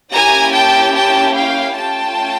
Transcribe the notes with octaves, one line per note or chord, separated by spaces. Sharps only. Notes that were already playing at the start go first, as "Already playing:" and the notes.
A#3 C#4 E4 G4 G#5 A#5
G5 A5
G5 A5
F5 G5
A3 C#4 F4 G5 A5